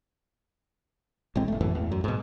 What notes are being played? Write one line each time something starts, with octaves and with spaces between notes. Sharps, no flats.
A1 A2 G#3 C4
F#1 A3
F#2 A2 E3 A3
E2
F#2
G#2 B2